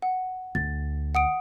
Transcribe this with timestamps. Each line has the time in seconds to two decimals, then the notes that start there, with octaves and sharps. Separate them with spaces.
0.02 F#5
0.55 D2 A6
1.15 F#5 D#6 D7